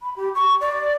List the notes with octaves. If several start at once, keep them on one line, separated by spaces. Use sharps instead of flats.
B5
G4
C#6
D5